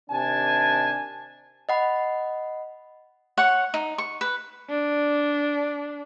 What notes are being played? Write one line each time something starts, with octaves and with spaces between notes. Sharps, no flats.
C3 D#3 D4 G#5 A5
D#5 F#5 B5
C#5 F#5 C#6
D#4
C#6
B4
D4